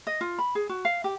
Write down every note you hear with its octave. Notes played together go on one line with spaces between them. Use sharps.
D#5
F4
B5
G#4
F#4
F5
G4